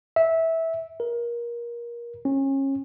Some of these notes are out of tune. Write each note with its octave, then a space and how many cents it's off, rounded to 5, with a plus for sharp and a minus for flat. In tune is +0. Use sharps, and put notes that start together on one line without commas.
E5 -15
A#4 +25
C#4 -30